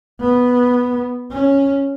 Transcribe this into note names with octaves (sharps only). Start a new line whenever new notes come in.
B3
C#4